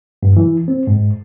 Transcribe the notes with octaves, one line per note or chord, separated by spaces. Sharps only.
G2
E3
C4
G#2